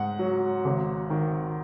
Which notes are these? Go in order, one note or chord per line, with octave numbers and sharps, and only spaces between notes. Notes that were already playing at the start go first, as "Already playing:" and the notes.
Already playing: G#2 F#5
F#3
G#1
D#3